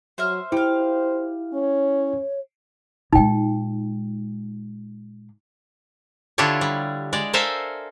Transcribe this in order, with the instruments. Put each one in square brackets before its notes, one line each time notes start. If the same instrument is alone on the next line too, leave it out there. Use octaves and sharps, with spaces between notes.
[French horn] F#3 [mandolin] C5 E5 F6
[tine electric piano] E4 [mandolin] G4 F5 [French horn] C5
[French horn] C#4 [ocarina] C#5
[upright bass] A#2 G#3 [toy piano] D#4 G5
[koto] D3 D4 E4 F4 G4 C#5
G3
G#3 D5
A4 A#4 C5 E5 F5 G#5